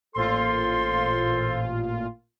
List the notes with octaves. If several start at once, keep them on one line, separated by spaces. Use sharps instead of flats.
A1 A#2 F4 A4 C5 C6